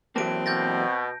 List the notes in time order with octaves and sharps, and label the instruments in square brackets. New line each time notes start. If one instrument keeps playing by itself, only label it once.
[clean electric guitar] E3 F#3 A#3 [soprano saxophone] C4 [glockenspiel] A5 D7
[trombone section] B2 [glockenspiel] G6 A6 A#6